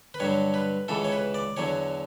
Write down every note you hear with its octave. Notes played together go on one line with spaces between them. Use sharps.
B4
G2 D3 F#3 C#5
B4
C#2 C#3 E3 A4
C#5
B4
D5
E2 D3 F#3 C#5